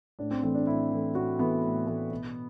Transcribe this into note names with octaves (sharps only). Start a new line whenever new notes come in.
A2 D4
C4
E3 A3 C4
D4
A2 E4
E3 A3
A2 F#4
E3 A3 B3
A2
E3 A3
B2